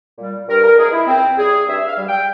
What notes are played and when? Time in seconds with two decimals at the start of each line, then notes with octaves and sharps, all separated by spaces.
0.17 A#2 G3
0.47 G2 A#4
0.62 A#4
0.77 E3 G#3 G#4
0.92 E4
1.07 C#2 C4
1.37 C#3 G3 G#4
1.67 G2 E5
1.87 F5
1.97 G3
2.07 G5